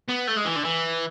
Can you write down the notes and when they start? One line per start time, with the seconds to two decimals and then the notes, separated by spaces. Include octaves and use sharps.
0.08 B3
0.27 A3
0.37 G#3
0.46 E3
0.56 D3
0.65 E3